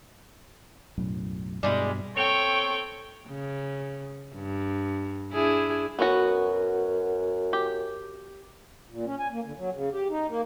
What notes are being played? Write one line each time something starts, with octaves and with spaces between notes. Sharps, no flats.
B1 F#2 A2
G2 B2 G3 G#3 E4
C4 A4 C#5 G5 C#6
C#3
G2
D4 E4 G#4
F#2 B3 C#4 F#4
G4
A#2
C#4
G#5
A#3
D3
F#3
C#3
G4
D#4
A#3